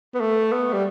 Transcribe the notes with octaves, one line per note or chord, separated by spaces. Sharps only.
B3
A3
B3
G3